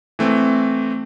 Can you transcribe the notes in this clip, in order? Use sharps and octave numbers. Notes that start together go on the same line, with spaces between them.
E3 A3 C4